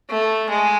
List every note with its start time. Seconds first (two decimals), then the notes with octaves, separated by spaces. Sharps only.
0.10 A3
0.49 G#3